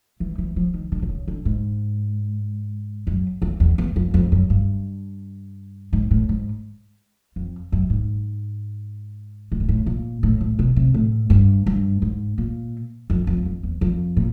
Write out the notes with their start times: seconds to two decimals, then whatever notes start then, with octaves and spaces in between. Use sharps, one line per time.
0.20 E3
0.38 E3
0.56 F3
0.74 D#3
0.92 D3
1.02 D3
1.09 C#3
1.28 D3
1.45 G#2
3.07 F#2
3.42 E2
3.60 E2
3.78 E2
3.96 F2
4.14 F2
4.32 F#2
4.50 G2
5.93 G#2
6.11 A2
6.29 G#2
7.36 F2
7.72 F#2
7.90 G#2
9.52 A2
9.60 A#2
9.69 A2
9.86 A#2
10.23 A2
10.41 A2
10.59 B2
10.76 C3
10.94 A2
11.30 G2
11.66 G2
12.02 G#2
12.38 A#2
13.10 F2
13.27 F2
13.46 F2
13.63 E2
13.81 F2
14.17 A#2